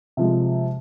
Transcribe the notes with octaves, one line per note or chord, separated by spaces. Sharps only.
C3 F3 G#3